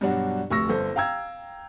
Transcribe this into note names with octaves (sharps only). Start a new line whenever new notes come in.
G2 B2 F#3 D4 F#4
F1 D2 C#6 E6 A#6
G1 A4 C5
F5 G5 A#5 E6 G#6